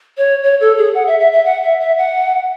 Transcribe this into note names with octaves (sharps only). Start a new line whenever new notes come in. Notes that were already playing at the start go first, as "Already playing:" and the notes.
C#5
C#5
A4
G#4
F#5
E5
E5
E5
F#5
E5
E5
F#5